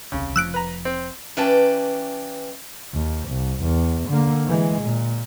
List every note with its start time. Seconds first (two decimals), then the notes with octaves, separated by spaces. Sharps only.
0.12 D#1 C2 C#3
0.36 F1 F3 E6 F#6 D7
0.54 B4 A#5
0.85 C4
1.37 E3 C#4 B4 D5 G5 A5
2.94 D#2
3.29 C2
3.63 E2
4.09 D3 A#3
4.46 E3 G#3
4.82 A#2